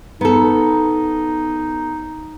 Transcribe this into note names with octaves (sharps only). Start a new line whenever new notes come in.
B3 D#4 A4